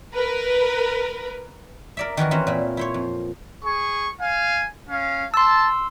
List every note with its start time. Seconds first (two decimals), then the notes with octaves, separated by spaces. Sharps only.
0.14 A#4 B4
1.97 A#4 D5 E5
2.17 D#3 E3 F#4 A#4
2.31 E3 C4 C#4 F#4 C5
2.47 A#2 E4
2.77 E4 C5 C#5
2.94 F2
3.65 G#4 C#6
4.20 F5 G#5
4.89 C#4 F5
5.34 A5 C6 E6